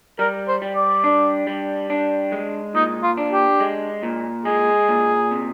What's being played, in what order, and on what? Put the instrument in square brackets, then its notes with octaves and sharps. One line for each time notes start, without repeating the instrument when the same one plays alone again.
[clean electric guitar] G3 [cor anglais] A#4
[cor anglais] C5
[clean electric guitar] G3
[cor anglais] D5
[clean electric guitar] D4
G3
D4
G#3
[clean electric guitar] A#2 [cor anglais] D#4
[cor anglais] F4
[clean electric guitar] D4
[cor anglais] G4
[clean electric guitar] G#3
A#2
[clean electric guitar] G#3 [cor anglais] G#4
[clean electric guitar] A#2
C3